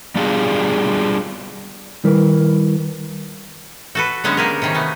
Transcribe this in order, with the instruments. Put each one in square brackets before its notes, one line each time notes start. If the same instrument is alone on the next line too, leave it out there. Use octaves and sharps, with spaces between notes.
[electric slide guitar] G3 B3 D4 F4 G4 G#4
[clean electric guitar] D#3 G3 E4 A#4 B4
[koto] F#4 A4 B4
D3 F#3 G#3 B3 C#4
A#3 G4 G#4 A#4
C3 D#3 C#4
A3 B3